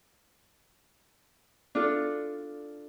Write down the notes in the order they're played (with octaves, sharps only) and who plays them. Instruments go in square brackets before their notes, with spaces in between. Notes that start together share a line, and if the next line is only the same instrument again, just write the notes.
[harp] D4 F4 A4